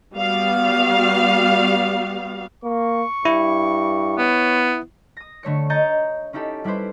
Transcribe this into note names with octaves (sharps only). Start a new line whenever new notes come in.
G3 B3 F#4 F5
A#3 C#6
G2 E4
B3 C#5
D#6 A#6
D3 A3 C#5 C#7
D#5 A#5 G6 A6 C#7
C#4 D#4 E4 G4 A4
G3 E4 G4 B4 C5